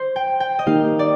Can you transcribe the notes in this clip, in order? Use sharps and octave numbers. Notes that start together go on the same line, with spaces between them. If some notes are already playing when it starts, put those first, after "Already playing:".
Already playing: C5
G5
G5
D#5
D#3 A#3 D#4 G4 F5
D5